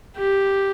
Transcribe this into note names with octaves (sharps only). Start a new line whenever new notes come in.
G4